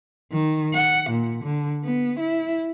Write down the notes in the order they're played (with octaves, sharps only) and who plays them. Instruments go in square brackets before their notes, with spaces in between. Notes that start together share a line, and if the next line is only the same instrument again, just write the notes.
[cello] D#3
F#5
A#2
D3
B3
E4